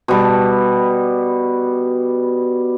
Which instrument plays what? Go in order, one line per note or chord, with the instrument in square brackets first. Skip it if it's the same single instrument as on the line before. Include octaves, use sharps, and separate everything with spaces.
[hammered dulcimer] B2 G3 A5